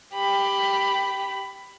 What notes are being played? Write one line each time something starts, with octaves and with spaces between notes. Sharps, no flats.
G4 B5